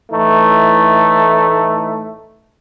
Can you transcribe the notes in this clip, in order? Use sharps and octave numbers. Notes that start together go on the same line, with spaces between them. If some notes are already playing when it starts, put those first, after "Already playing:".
A2 E3 A3 D#4